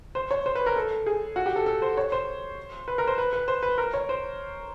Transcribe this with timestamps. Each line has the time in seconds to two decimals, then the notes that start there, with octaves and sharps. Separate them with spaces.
0.15 C5
0.31 C#5
0.46 C5
0.55 B4
0.66 A#4
0.76 A4
1.06 G#4
1.36 F#4
1.46 G4
1.56 A4
1.66 A4
1.82 C5
1.97 C#5
2.12 C5
2.88 B4
2.98 A#4
3.07 C5
3.18 B4
3.33 B4
3.48 C5
3.63 B4
3.78 A#4
3.94 C#5
4.09 C5